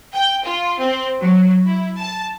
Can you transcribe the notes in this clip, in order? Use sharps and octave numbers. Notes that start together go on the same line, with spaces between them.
G5
F4
C4
F#3
E4
A5